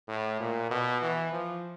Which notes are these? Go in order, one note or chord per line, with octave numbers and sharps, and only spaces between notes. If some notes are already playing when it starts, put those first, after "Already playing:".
A2
A#2
B2
E3
F3